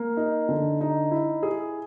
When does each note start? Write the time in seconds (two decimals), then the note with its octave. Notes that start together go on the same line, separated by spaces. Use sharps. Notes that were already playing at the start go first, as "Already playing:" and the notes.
Already playing: A#3
0.17 D#4
0.49 D3
0.81 D#4
1.11 E4
1.43 G#4